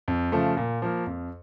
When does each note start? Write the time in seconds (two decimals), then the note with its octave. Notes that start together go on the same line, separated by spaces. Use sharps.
0.08 F2
0.32 C#3 F3 A3
0.57 A#2
0.82 F3 A#3
1.07 F2